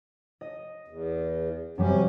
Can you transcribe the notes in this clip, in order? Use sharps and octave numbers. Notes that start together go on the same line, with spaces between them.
D#5
E2
F#2 C3 F#3 G3 C#4